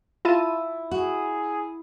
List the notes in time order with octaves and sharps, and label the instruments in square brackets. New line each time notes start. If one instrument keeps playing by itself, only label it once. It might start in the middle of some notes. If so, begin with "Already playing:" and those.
[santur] E4 [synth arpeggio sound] F4 A5 D#7
[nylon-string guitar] F#4 [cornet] G#4